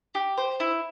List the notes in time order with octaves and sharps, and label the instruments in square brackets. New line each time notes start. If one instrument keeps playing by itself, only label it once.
[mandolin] G4
C5
E4